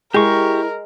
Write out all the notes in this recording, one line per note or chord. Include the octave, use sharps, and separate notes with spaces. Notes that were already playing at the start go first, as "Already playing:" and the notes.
G#3 E4 G4 A#4 C#6